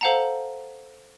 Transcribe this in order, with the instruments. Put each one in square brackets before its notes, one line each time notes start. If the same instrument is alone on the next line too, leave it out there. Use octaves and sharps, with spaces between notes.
[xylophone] A4 C5 F5 F#5 A5 A#5